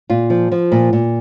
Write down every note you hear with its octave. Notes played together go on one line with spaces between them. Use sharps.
A#2 F4
F3
F3
A#2
A#2